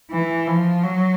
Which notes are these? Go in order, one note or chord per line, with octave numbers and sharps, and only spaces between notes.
E3
F3
F#3